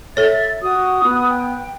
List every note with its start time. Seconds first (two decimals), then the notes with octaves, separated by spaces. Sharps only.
0.17 A4 C#5 E5 A6
0.62 F#4 D#6
1.04 B3
1.30 G5